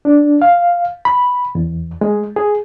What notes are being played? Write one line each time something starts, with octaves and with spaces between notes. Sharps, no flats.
D4
F5
B5
E2
G#3
G#4